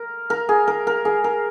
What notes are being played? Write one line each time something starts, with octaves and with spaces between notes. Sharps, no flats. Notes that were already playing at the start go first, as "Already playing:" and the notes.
Already playing: A#4
A#4
G#4
A#4
A#4
G#4
A#4